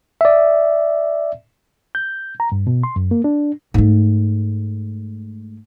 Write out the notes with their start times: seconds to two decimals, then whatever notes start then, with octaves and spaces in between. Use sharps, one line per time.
0.21 D5 E5
1.95 G6
2.40 A#5
2.52 G2
2.67 B2
2.83 C6
2.96 F#2
3.11 A#3
3.24 D4
3.74 G#2 A3